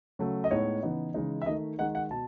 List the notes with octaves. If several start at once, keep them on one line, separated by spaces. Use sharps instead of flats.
C#3 F#3 A3
D#5
A2 G#3 B3 D#4 C#5
C#3 E3 B3 D#4
C#3 E3 G#3 D#4
E5
D#3 A3 D#4 D#5
D#3 G#3 D#4 F#5
F#5
B2 A5